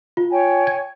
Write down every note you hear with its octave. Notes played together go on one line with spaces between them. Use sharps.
F4
C#5 G5 G#5
G#6